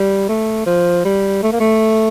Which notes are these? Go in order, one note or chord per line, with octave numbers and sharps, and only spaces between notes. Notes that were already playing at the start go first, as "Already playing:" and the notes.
Already playing: G3
A3
F3
G3
A3
A#3
A3